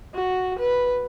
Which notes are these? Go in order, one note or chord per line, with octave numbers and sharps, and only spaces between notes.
F#4
B4